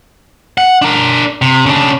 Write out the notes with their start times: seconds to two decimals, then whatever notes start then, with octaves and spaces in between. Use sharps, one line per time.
0.58 F#5
0.82 D4 A#4
1.42 C3
1.66 C#3 D4